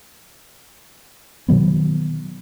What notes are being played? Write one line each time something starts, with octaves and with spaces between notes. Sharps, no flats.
B2 D#3 F#3 B3